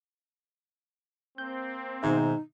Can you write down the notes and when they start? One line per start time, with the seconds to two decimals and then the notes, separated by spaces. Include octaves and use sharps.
1.38 A#3 C4 G6
2.03 G#2 B2 D#3 D#4 E5